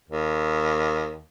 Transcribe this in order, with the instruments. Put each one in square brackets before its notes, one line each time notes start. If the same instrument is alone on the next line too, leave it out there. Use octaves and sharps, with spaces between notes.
[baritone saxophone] D#2